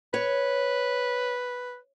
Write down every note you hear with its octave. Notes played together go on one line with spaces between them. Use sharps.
B4 C#5